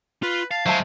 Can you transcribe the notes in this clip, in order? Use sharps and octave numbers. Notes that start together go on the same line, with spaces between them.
F4 B4
F5 A5
F#3 G#3 C5 E5 A5